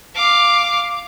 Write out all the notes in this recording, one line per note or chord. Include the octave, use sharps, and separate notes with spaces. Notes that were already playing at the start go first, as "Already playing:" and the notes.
F5 D6